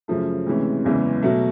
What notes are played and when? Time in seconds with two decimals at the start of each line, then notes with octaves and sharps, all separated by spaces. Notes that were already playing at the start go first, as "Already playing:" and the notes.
0.08 F#2 C#3 F3 A3
0.46 D2 C3 E3 G#3 C#4
0.84 F#1 E2 C#3 E3 G#3
1.23 B2 F#3 A3